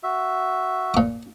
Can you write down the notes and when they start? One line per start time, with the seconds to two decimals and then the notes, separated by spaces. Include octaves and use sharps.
0.03 F#4 E5
0.94 A#2 D6